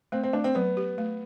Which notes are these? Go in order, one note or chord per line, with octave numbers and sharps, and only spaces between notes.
A3 C4
C4
A3 D4
C4
F#3 B3
G4
A3